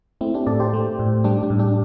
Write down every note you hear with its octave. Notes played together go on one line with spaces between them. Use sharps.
A3 C4 E4
D4 G4
A2 A4 D5
G4 C5
A3
A2
G3 D4 G4
D4
A2
D4 G4